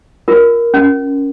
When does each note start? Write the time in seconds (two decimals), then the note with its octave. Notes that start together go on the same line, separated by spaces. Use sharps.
0.28 F4 A#4
0.74 C#4